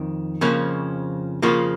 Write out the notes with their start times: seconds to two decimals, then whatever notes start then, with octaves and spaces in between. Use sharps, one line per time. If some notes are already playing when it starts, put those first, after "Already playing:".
Already playing: F2 D#3
0.41 F2 C#3 F3 A#3 C#4
1.42 F2 C#3 F3 A#3 F4